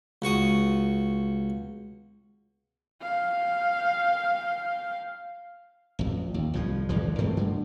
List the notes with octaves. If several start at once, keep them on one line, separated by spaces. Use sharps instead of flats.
C#2 F#4 C#6 D#6
F5 G5
A1 F2
D#2
C2 A2 F3
G#1 E2 E3 F3
G2 A3 C4
D3